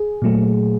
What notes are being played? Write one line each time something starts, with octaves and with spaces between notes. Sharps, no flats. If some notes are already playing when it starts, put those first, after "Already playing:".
Already playing: G#4
A#2 F#3 A3